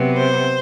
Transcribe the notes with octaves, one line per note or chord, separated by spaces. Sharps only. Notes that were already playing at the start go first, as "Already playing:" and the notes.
Already playing: C3 F#3 B3
C5